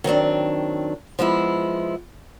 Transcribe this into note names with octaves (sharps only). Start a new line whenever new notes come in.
D#3 F#3 C4 D4
F3 G#3 B3 E4